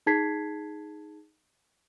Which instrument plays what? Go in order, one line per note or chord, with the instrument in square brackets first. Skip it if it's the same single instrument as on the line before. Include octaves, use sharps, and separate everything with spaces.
[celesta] D#4 G#4 A5 G#6 B6 C7